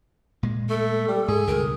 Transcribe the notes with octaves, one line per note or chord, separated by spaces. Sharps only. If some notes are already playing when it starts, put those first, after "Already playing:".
A#2 G#3
A3 A4
G3
G#2 G#4
C#2 G2 B2 A#4